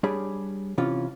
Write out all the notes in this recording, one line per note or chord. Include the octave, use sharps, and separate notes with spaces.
G3 D4 G4 G#4 C#5 B5
C3 E3 C#4 F4